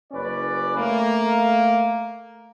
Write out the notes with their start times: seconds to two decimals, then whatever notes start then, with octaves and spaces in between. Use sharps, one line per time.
0.12 F#1 C#4 B4 D5
0.77 A3 A#3